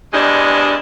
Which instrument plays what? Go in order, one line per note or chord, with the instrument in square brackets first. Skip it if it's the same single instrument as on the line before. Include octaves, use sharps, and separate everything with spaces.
[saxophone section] E2 G2 C3 G#3 D4 D#5